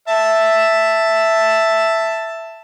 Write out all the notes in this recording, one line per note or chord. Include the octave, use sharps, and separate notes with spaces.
E5 A5